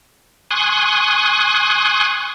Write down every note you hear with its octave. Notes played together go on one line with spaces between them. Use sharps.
G#5 C6 C#6 D#6 F#6